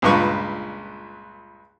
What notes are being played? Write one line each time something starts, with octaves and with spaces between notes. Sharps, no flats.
C#2 G2 A#2 B4 C#6